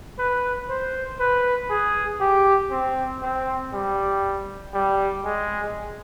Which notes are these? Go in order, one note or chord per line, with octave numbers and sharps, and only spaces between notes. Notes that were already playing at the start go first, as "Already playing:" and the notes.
B4
C5
B4
G#4
G4
C4
C4
G3
G3
G#3